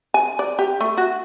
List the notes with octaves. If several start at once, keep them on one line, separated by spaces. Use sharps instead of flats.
G#5
D5
G4
A3
F#4